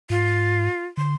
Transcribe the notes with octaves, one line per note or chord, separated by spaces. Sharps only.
G#2 F4
D3 C6